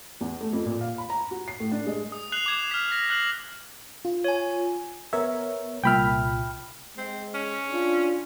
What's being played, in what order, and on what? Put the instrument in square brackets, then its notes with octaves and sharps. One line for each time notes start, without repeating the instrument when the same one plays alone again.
[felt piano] E2
A3
F2
A#2
F5
B5
A#5
F#4
C7
A2
D4
G#3
[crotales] D#6
F#6 C7 F7 F#7
D6 G#6 E7
F6 B6
A#6
F6 F#6 C7 F#7
[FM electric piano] F4
[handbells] C#5 G#5
[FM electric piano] B3 A#4 C#5 [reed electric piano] E5
[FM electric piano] C2 A#2 E5 [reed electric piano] G5 B5 F6
[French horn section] G#3 [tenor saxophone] C4
[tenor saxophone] C#4
[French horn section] D4 F4